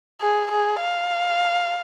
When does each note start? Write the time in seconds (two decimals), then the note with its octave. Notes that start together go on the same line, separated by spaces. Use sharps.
0.21 G#4
0.51 G#4
0.81 F5